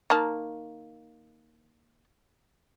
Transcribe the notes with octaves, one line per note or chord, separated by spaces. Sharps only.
D#3 A#3 A5